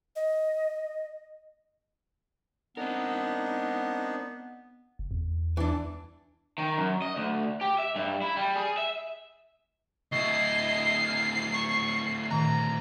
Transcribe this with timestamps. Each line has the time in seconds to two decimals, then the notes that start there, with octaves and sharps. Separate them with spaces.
0.16 D#5
2.77 B3 C4 D4 D#4 A#4
4.99 F#1
5.11 E2
5.57 E3 D4
6.58 D#3
6.78 F#2
7.02 D#5
7.16 D2
7.61 G4
7.79 E5
7.96 G2
8.22 E4
8.37 G3
8.56 G#4
8.77 E5
10.12 D2 E4 D#5 C#6 C7
11.08 D#5 F6
11.54 C#6
12.31 A#2 D#3 A#5